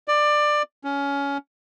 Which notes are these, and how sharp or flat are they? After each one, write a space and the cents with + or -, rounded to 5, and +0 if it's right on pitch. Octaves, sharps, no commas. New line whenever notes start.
D5 +20
C#4 +20